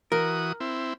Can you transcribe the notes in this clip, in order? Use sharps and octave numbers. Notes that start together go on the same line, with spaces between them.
E3 F#4 A#4 D#6
C4 E4